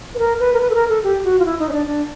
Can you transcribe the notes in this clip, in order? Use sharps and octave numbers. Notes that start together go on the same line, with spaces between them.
B4
A#4
B4
A#4
B4
A4
A#4
A4
G4
F#4
F4
E4
D#4
C#4
D4
D4